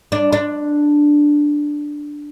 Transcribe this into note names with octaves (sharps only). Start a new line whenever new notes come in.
D4
D4